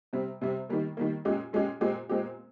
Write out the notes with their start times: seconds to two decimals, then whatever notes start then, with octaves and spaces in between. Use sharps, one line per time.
0.13 C3 G3 C4
0.41 C3 G3 C4
0.69 D#3 G3 A#3
0.97 D#3 G3 A#3
1.25 A#2 G#3 C#4 G4
1.53 A#2 G#3 C#4 G4
1.81 A#2 G#3 C4 G4
2.09 A#2 G#3 C4 G4